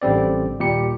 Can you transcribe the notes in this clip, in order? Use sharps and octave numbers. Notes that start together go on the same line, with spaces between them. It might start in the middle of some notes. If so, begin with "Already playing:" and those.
A1 D3 G3 C4 D5
D#2 A#2 G3 G4 C#7